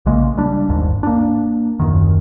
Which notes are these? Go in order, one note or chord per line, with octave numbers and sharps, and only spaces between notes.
A#1 C#3 G#3 A#3
G3 D4
G1 D#2 G#2
A#3 D4
D#1 F#2 D#3